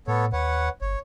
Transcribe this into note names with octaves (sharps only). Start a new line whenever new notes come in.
A2 B3 A4 C#5
D#2 B4 C#5 F#5
G1 C#5